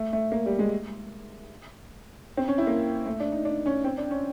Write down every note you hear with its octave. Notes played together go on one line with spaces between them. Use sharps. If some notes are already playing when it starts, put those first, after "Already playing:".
Already playing: A3
A3
A#3
G3
G#3
C4
C#4
E4
A#3
A3
D4
D#4
D4
C#4
C4
D4
C#4